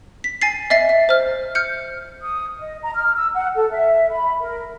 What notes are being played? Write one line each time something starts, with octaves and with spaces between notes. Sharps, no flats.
B6
G#5 A6 C7
D#5 E5 A6 C7
E5
C5 F6
F6 G6 C#7
D#6
D#5
A#5
F6
E6
F#5
A4
E5
B5
A#4